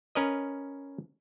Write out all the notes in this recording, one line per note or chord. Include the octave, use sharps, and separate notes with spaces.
C#4 A#4 B4 D#5